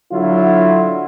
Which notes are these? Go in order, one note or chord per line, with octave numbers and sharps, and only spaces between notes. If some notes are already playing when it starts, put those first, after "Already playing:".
D3 F#3 E4 F4